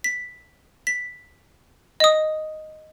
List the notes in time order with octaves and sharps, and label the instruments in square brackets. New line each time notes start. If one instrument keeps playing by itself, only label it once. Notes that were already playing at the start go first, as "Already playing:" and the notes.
[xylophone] B6
B6
D#5 D#6